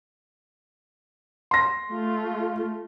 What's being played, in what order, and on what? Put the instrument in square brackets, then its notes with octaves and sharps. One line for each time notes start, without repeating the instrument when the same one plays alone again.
[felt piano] C6 A#6
[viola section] A3 F4